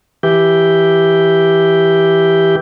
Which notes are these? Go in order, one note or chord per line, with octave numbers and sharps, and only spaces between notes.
E3 G4